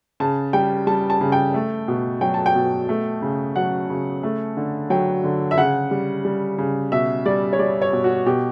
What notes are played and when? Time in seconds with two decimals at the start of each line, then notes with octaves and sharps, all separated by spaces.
0.20 C#3 A5
0.53 G3 G5
0.87 G3 A5
1.10 A5
1.21 C#3
1.32 G5
1.54 A3
1.88 B2
2.21 F#3 G5
2.34 A5
2.46 G5
2.55 B2
2.89 A3
3.22 C#3
3.56 F#3 F#5
3.90 C#3
4.23 A3
4.57 D3
4.90 F#3 G5
5.24 D3
5.51 E5
5.57 C#3 F#5
5.91 G3
6.25 G3
6.58 C#3
6.92 B2 E5
7.25 G3 D5
7.53 C#5
7.59 G3 D5
7.82 C#5
7.93 B2
8.04 F#4
8.26 B2 G4